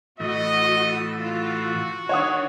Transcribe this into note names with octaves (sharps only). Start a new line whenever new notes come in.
A2 E3 F#4 D#5
F4 F#4
D#3 D4 C#5 F#5 D#6